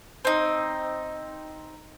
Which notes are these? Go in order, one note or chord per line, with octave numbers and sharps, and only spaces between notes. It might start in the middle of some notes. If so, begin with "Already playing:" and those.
C4 D#4